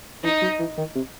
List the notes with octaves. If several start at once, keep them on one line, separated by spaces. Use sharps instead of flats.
E3 D#4
F#3
E3
D#3
C3